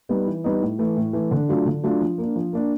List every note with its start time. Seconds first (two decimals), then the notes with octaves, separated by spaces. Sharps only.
0.09 G3 B3 D#4
0.27 E3
0.44 G3 B3 D#4
0.62 A2
0.79 E3 A3
0.97 A2
1.13 E3 A3
1.31 D3
1.49 F#3 A3 D4 F4
1.66 D3
1.83 F#3 A3 D4 F4
2.01 F3
2.18 A#3 D4
2.36 F3
2.53 A#3 D4